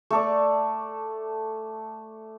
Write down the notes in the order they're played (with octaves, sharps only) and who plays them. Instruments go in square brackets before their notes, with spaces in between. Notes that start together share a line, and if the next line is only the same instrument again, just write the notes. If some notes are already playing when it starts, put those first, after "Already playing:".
[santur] A3 A4 D5